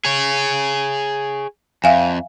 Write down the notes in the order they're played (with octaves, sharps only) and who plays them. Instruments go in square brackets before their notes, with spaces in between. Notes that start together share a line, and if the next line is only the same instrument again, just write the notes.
[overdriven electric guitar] G#4 C#5
[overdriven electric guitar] F2 [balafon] E5 F5 G#5